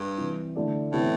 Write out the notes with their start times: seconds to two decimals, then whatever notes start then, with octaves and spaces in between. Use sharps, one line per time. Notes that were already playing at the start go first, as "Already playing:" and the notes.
Already playing: G2
0.18 C3 E3 G3
0.56 D3 A3 E4 A4 D5
0.92 A2 C3 E3 B3 E4 G4